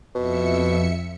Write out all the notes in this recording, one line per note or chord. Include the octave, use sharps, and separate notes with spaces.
F2 B2 E5 C#7